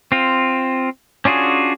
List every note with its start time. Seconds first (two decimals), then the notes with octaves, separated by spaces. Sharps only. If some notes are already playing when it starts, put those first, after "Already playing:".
0.12 C4 F4
1.25 C#4 D4 F4 F#4 G#4